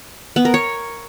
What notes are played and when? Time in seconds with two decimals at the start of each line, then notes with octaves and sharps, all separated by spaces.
0.36 B3
0.45 A#4
0.54 C#5